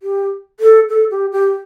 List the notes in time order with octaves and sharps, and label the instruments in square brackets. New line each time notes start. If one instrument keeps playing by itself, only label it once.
[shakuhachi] G4
A4
A4
G4
G4